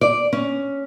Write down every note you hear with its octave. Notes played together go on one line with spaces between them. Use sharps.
D5
C#4